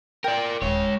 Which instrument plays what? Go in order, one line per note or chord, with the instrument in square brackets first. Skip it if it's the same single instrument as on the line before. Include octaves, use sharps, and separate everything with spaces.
[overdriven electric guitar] A#4 D5 [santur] G5
[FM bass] D#1 [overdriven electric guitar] G#3 C#5